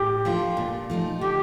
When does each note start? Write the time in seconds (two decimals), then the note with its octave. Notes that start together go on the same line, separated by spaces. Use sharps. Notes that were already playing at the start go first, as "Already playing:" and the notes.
Already playing: A2 G4
0.25 F3 A3 D4 F4
0.57 A#2
0.90 F3 A3 C4 D#4
1.21 D3 G4